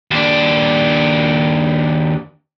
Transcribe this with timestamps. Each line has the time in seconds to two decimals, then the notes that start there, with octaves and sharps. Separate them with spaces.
0.11 D#2 D4